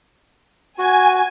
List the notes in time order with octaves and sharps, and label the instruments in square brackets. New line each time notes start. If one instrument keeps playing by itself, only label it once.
[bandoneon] F#4 [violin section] G#5